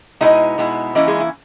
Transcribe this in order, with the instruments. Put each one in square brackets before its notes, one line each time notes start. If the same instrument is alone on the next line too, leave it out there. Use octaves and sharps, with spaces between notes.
[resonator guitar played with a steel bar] B2 G#3 B3 D#4 E4 D#5
B2 G#3 B3 E4
E3 A#3 C#4 E4 D#5
G#3 G#4
E4